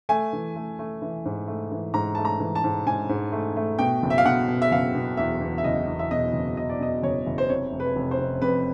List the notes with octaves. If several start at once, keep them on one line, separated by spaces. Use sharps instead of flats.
A3 G#5
E3
A3
A3
E3
G#2
A3
E3
G#2 A#5
A3 A5
A#5
E3
A5
G#2
G#2 G#5
G#2
A3
A3
B2 G5
F#1
E5
F5
B2 F#5
B2
E5
F#1 F5
B2
E2 E5
E2
E5
F#1 D#5
E2
E5
B2 D#5
F#1
B2 D#5
D5
B2 D#5
F#1 C#5
F#1
C5
C3 C#5
F1
B4
F1
C5
F1
F2 B4